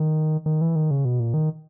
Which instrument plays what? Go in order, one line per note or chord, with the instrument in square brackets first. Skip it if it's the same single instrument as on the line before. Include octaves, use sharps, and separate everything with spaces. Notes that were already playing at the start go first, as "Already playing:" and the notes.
Already playing: [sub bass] D#3
D#3
E3
D#3
C#3
B2
A#2
D#3